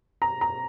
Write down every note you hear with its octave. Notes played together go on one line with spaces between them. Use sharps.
A#5
A#5